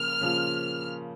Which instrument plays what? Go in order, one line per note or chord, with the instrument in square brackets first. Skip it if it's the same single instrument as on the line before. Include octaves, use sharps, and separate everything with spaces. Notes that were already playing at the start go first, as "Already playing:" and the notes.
Already playing: [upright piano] C#3 F3 A#3 F4 [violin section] F6
[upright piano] C#3 F3 A#3 F4